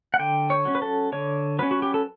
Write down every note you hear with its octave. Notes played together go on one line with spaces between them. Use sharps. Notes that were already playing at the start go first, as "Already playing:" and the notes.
F#5
D3 G5
C#5
F#3 C#4
B4
A4
D3 C#5
F#3 C#4 B4
F#4
G4
A4